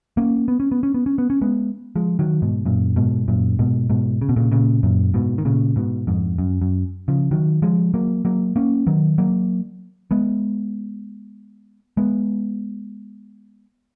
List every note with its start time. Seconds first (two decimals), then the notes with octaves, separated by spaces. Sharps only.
0.17 A#3 C#4
0.48 B3
0.60 C#4
0.72 B3
0.83 C#4
0.94 B3
1.06 C#4
1.18 B3
1.30 C#4
1.41 G#3 B3
1.96 F3 G#3
2.19 D#3 F#3
2.42 G#2 B2
2.66 F#2 A#2
2.96 G#2 B2
3.28 F#2 A#2
3.59 G#2 B2
3.90 G#2 B2
4.21 C#3
4.29 B2
4.36 A#2 C#3
4.52 A#2 C#3
4.83 F#2 A#2
5.14 G#2 B2
5.38 D#3
5.45 A#2 C#3
5.76 G#2 B2
6.07 F2 G#2
6.38 F#2
6.62 F#2
7.08 C#3 F3
7.31 D#3 F#3
7.62 F3 G#3
7.94 F#3 A#3
8.25 F#3 A#3
8.56 A#3 C#4
8.87 D#3 F#3
9.18 F#3 A#3
10.11 G#3 B3
11.97 G#3 B3